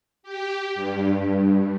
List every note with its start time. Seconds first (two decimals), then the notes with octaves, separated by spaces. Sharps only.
0.23 G4
0.75 G2